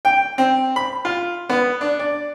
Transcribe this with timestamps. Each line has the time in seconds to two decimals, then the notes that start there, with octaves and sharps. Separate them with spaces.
0.05 G5
0.38 C4
0.76 B5
1.05 F4
1.49 B3
1.81 D4
1.99 D5